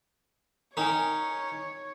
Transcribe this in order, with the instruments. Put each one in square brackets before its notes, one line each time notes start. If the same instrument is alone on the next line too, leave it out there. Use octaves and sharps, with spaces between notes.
[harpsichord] C#4 D#4 [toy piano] A#4 G5 G#5 [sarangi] C#5